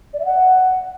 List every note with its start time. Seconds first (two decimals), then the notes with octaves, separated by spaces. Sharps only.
0.13 D5
0.19 E5
0.25 F#5